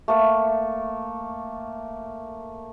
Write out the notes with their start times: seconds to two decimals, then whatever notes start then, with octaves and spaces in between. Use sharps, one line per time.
0.08 A3 A#3